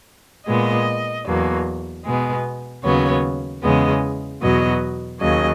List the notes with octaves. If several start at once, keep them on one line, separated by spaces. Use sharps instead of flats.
A#2 G#3 B3 D#5
E2 B2 F#3 A#3
B2 G#3 B3
D#2 C#3 F#3 B3 C#5
E2 C#3 G#3 B3 D#5
E2 B2 F#3 B3 D#5
D#2 C#3 F#3 D#5